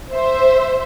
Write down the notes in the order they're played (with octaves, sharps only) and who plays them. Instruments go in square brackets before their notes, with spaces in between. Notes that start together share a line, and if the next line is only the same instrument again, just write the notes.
[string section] C5 E5